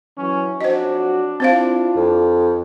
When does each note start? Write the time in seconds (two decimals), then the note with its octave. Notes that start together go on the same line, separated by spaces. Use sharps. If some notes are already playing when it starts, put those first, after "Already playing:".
0.17 E3 F#3 C#4
0.61 F2 F#3 D4 F#4 C5 D#5
1.40 C4 E4 F4 C5 F5
1.96 F2